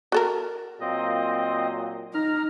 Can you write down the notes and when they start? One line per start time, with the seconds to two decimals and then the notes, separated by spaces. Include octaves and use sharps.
0.12 F#4 A4 A#4
0.81 A#2 F#3 C4 D#5
2.14 D#4 A#5 F6